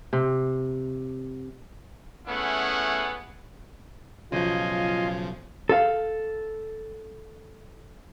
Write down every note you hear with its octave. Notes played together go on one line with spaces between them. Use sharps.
C3
A3 B3 C#4 E4 G#4 F#5
B1 C#3 F3 F4 F#4 D#5 G#5 C6
A4 F5